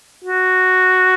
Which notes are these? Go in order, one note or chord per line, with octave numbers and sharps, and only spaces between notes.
F#4